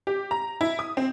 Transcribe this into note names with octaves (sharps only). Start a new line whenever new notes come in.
G4
A#5
E4
D#6
C4